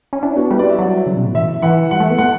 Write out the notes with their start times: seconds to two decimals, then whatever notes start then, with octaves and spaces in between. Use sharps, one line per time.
0.13 C#4
0.22 D4 E4
0.36 B3 F#4
0.51 G3 B4
0.59 D5
0.69 E5
0.79 F#3
1.06 C#3
1.16 B2
1.26 A2
1.34 E3 E5
1.62 E3 F#5
1.91 G3 F#5
2.00 A3
2.10 B3
2.19 A3 F#5